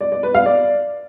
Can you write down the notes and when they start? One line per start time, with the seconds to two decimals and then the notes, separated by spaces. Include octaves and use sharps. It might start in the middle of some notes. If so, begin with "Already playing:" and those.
0.01 D5
0.12 D5
0.23 B4
0.34 F5
0.46 D5